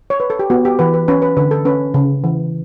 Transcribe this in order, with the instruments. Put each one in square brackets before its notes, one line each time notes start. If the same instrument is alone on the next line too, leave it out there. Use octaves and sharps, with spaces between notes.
[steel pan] C#5
B4
A4
G4
B3 F#4
G4
E3 B4
B4
C#4 B4
B4
D3 B4
A4
C#4 B4
C#3
E3